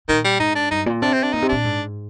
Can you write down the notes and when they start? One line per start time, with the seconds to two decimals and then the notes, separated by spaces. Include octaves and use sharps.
0.09 A#2 D#3
0.24 G3
0.40 G#2 D#4
0.55 D4
0.71 G2 D#4
0.86 A#2
1.02 C3 D4
1.13 C4
1.23 D4
1.33 A#2 D#4
1.42 C3
1.49 A#2 D4
1.65 G#2